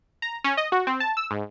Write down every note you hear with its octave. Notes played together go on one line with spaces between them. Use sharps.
A#5
C#4
D#5
F#4
C4
A5
E6
G#2